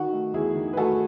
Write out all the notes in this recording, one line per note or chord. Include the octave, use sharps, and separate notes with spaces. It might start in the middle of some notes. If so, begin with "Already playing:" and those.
Already playing: D#3 F#4
A3
E2 E4 G#4
D#3
B4
A3 F#4 A4